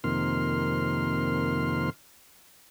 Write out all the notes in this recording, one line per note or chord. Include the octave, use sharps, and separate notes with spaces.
F2 C3 D#3 A#3 C6 F6